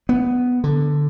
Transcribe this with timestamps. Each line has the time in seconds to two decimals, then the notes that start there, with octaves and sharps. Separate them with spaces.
0.09 B3
0.64 D3